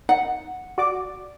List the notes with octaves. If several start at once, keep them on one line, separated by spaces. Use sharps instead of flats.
D#4 F#5
F#4 D5 D6